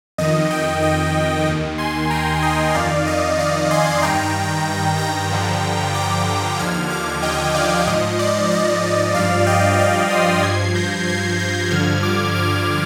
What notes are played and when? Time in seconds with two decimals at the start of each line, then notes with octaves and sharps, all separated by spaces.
0.18 F2 D#3 D#5
0.51 D#5 G5
0.82 D#5
1.47 D#2 D#3
1.78 G#5 C6
2.10 G5 A#5
2.42 D#5 G5
2.74 F2 D#3 D5 F5
3.07 D#5
3.39 D5
3.71 G#5 C6
4.02 G2 D#3 G5 A#5
4.98 G5 A#5
5.31 G2 D3 F3
5.94 A#5 D6
6.58 D#2 D3 F3 F6 G#6
6.90 D6 F6
7.23 D#5 G5
7.54 D5 F5
7.87 G#2 F3 D#5
8.19 D5
8.51 D#5
9.14 G2 F3 D5 F5
9.47 D#5 G5
9.79 D5 F5
10.11 C6 D#6
10.42 G2 F3 G#6 C7
10.75 G6 A#6
11.07 G#6 C7
11.39 G6 A#6
11.70 G2 D3 F3 F6 G#6
12.02 D6 F6
12.35 D6 F6